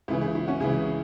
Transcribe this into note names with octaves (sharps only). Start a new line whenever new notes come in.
C#2 C#3 E3 E4
E4 G#4
E4
C#4 F#4
C#2 C#3 E3 E4 G#4